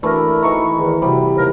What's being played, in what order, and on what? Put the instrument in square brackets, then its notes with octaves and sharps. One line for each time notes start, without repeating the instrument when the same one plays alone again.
[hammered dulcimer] E3 A3 [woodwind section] D4 A#4
[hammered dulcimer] E3 A#5 [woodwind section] D#4 E5 C#6
[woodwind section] E2 D#3
[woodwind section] C3 [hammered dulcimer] G3
[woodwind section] D#2 A#4